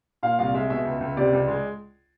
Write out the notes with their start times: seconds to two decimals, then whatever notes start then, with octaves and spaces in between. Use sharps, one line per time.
0.23 A#2 F5
0.39 C2 F5
0.54 G#3 E5
0.70 B2 E5
0.86 C#2
1.01 C#2
1.17 C3 D5
1.33 C#2
1.48 G#3